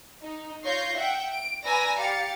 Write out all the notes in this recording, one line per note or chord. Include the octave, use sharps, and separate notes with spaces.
D#4
F4 C#5 G6 A#6 C7
E5 F#5 G5
D7
B4 D5 G#5 A#5 E6 A#6
G4 F5 A6 C#7